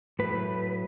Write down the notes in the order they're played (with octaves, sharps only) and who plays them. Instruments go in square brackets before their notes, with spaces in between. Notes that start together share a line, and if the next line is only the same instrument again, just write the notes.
[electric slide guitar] A2 F#3 A3 B4